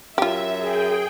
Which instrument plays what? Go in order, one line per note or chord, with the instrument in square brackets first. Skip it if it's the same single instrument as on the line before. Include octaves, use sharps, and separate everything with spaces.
[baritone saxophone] F#2 [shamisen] F4 G4 [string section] E5
[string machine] G#4 G5